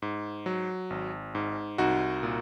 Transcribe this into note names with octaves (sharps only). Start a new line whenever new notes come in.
G#2
F#3
G#1
G#2
C2 D#4 F#4
A#2